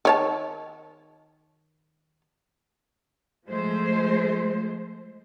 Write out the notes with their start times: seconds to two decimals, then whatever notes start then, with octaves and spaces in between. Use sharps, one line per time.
0.05 D#3 C#5 A5
3.49 F3 G#3 A3 C5